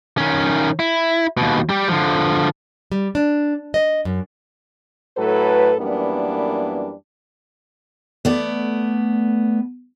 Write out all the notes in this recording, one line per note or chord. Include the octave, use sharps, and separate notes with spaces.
D#3 C#4
E4
D#2 B2
G3 G4
D3 F3
G3
D4
D#5
F#2
A2 F#3 A4 B4
F#2 E3 G3 A#3 B3 D4
A3 B3 D5